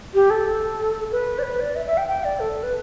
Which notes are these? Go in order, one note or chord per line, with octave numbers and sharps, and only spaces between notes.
G4
A4
B4
D5
B4
D5
E5
E5
G5
G5
D5
A4
B4